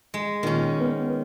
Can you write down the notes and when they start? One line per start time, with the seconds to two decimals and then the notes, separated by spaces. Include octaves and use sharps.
0.14 G#3
0.43 A#2 D#3 C#4
0.80 B3